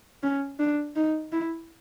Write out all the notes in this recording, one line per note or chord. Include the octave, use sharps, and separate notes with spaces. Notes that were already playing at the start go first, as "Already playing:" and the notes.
C#4
D4
D#4
E4